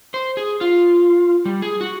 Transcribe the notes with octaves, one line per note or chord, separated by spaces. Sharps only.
C5
G#4
F4
G3
G#4
F#4